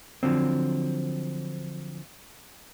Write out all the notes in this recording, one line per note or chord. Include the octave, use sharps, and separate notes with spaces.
D3 F3 F#3 C4